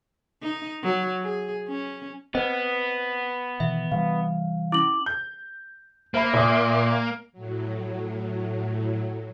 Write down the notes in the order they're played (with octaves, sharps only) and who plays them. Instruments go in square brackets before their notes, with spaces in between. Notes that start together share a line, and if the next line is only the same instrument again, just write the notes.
[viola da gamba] D#4
F#3
G#4
C#4
[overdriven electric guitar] B3 [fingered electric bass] C4 [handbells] B4 C5 D#5
[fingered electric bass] B2 D#3 E3 [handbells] E5
[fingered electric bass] C3 E3 G3 [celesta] F5
[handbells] C#4 E4 [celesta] D6 F#7
[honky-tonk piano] G6
[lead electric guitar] A#3 [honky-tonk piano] C5 E5 B5
[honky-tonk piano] A#2 E5 D#6
[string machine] A2 F#3